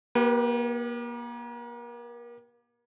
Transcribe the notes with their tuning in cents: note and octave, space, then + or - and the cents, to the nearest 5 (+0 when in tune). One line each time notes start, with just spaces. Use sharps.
A#3 +35 G4 -10 B4 +0